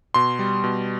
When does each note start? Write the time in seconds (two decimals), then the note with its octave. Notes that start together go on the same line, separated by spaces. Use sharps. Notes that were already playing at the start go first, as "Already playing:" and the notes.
0.14 B2 C6
0.39 G3
0.64 B2